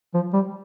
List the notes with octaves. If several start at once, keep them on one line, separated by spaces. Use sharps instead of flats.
F3
G3